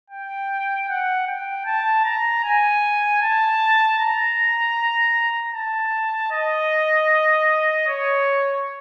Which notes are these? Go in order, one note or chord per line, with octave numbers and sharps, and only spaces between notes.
G5
F#5
G5
A5
A#5
G#5
A5
A#5
A5
D#5
C#5